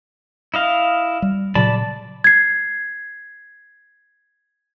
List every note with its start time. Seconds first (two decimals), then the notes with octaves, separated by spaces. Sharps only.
0.54 E4 D#5 F5
1.22 G3
1.55 A#2 C#3 F#3 D5 A5 B5
2.24 G#6 C7